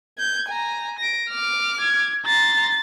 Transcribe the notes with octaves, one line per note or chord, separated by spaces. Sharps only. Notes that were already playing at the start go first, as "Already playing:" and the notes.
G6 G#6
G#5 A#5
A#6 D7
D6 F6
G#6
A#5 C6 A6